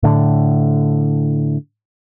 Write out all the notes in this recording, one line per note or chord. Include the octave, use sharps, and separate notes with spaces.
A2 D3